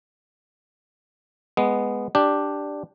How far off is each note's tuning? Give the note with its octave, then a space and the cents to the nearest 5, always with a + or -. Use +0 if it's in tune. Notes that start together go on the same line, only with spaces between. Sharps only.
G#3 +0 B3 +0
D4 +0 G4 +0